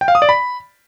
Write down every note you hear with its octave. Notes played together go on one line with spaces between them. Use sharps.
G5
F5
D#6
D5
B5